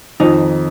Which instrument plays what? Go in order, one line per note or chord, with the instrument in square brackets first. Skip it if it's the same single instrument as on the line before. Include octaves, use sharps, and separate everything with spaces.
[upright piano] F2 [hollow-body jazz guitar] D#3 D#4